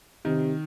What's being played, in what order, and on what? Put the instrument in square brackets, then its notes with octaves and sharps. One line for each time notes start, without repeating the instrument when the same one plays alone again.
[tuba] C3 [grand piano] D#3